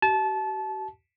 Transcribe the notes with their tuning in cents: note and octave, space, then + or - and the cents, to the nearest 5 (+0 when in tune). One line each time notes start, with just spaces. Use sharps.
G4 -45 A5 -25